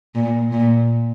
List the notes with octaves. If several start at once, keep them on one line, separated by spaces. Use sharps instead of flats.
A#2
A#2